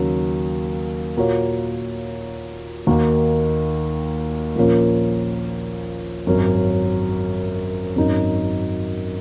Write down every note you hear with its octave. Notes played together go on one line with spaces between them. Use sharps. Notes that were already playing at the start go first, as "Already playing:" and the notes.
Already playing: D#2 C#3 F#3
A#2 A#3 F#4 C#5
D#2 D#3 A#3 D#4 F#4
A#1 A#2 A#3 C#4
G#1 F#2 F#3 C#4
G#1 F#2 F#3 D#4